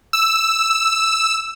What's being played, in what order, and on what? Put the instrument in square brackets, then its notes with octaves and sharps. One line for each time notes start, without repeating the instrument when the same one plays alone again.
[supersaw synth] E6